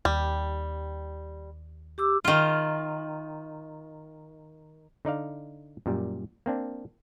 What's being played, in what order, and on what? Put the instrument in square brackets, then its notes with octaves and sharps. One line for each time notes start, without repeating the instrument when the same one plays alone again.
[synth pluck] D#2 [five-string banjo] G3
[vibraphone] G4 D6 E6
[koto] D#3 F4
[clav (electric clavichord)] D3 D#4 D5 F5
F#2 A#2 G3
A#3 C4 D4